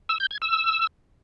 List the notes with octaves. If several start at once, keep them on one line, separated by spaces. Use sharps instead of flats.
E6
G6
G#6
E6